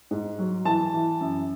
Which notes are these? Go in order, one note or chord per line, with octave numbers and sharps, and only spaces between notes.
G#2
F#3
E3 A5
E3
F#2